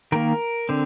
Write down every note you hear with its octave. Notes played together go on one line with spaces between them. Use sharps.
D#3 A#3 A#4
D3 C4